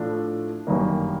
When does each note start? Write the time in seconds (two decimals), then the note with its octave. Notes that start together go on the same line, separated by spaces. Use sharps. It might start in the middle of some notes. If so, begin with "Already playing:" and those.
Already playing: A2 F3 A3 D4
0.67 G1 F#2 D#3 G3 A#3